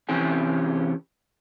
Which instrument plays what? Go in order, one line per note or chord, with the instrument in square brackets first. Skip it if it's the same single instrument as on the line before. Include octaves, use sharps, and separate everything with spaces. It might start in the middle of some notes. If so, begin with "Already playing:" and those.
[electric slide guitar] C3 E3 C#4 G4 G#5